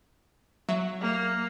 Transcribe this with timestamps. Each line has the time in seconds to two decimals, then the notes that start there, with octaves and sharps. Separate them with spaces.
0.69 F#3 E5
1.01 A#3